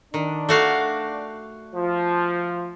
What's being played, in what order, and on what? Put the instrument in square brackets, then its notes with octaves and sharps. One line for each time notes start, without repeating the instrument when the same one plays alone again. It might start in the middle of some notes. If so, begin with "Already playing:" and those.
[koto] D#3 [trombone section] D4
[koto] A3 F#4 F5
[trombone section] F3